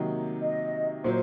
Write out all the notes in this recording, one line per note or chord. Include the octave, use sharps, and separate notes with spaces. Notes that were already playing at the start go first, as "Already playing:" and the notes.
Already playing: C3 D#3 F#3 A#3 D#4
D#5
A#2 F#3 C5